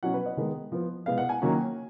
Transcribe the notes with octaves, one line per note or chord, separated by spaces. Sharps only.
B2 F#3 C#4 F#5
B4
D#5
D#3 G#3 B3
F3 B3
B2 G#3 B3 F5
F#5
G#5
D#3 F#3 A#3 C#4